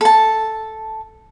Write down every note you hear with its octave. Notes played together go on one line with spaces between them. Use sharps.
A4 A5